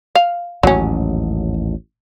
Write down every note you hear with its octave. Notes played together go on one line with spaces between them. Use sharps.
F5
A1 D#2 G#2 F#3 C#4